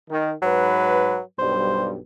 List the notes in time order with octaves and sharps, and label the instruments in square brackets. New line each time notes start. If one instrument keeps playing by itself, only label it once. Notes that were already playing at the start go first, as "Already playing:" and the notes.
[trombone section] D#3
[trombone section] G#2 B4 [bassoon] F#3
[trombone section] B1 G2 G3 [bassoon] C5